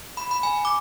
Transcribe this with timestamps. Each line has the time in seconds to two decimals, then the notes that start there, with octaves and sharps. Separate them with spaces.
0.17 B5
0.31 B5
0.43 G#5
0.65 D6